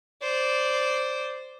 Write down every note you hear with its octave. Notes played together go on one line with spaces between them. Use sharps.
C5 D5